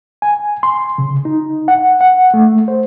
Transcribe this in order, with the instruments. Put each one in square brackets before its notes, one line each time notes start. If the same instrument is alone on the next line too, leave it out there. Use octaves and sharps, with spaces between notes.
[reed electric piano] G#5
C6
C#3
D#4
F#5
F#5
A3
C5